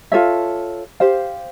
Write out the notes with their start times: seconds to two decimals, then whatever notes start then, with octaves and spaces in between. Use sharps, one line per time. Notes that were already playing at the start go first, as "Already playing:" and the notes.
0.12 F4 A4 C#5 E5
1.00 G4 C5 F5